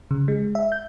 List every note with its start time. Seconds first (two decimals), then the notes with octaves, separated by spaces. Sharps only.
0.11 C#3
0.28 G#3
0.55 E5
0.72 G6